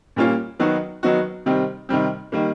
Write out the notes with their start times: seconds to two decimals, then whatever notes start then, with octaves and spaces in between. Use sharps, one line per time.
0.16 A#2 G3 A#3 C#4 F4
0.59 D#3 F#3 B3 D#4 F#4
1.03 D#3 F#3 B3 D#4 F#4
1.46 C3 D#3 G3 C4
1.89 C3 D#3 G3 C4
2.32 D#3 G3 A#3